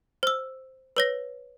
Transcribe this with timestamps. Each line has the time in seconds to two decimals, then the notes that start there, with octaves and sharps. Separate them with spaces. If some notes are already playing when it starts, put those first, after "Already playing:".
0.23 C5 E6
0.97 B4 C#5 A#6